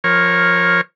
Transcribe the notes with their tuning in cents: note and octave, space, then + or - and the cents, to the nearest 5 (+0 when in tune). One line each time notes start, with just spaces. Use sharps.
F3 +0 A#4 +0 C#5 -15